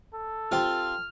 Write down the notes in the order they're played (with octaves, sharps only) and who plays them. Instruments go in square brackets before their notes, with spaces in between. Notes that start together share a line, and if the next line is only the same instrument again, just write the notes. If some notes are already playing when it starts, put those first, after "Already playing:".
[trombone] A4
[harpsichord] C4 F4 G4 [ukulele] C5 G5 [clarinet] F6